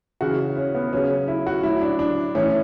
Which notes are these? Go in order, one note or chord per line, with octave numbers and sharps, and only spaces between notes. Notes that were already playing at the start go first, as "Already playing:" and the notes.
C#3 E3 F#4
C#4
B3
C#3 F#3 C#4
E4
F#4
A2 F#3 E4
D4
D4
A2 E3 C#4